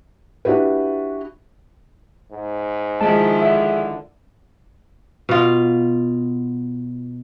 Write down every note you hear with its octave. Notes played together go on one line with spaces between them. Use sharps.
D4 E4 F#4 G4 B4
G#2
D#3 F3 G#3 E4 A5
D3 E5
B2 F4